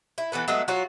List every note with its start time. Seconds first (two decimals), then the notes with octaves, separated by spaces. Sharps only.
0.18 E4
0.32 E3 B3 A4 B4
0.48 F#3 G#3 A3 B3
0.68 F#3 F4 F#4 C#5